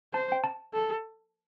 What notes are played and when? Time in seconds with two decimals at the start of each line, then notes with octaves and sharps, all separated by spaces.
0.13 C5 A5
0.32 G5
0.44 A5
0.74 A4